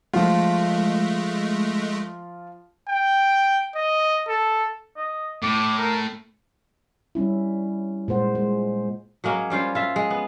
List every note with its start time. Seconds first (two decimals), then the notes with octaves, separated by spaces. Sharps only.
0.14 F3 G#3 A3 F4
2.88 G5
3.75 D#5
4.28 A4
4.97 D#5
5.42 A2 D6
5.79 A#4
7.15 G3 C#4 E4
8.08 A#2 G#3 C5 F#5
8.35 G#3
9.24 F#3 G#3 A#3 C#4
9.50 G3 C#4 F4 C5
9.75 F4 E5
9.96 G#3
10.10 B3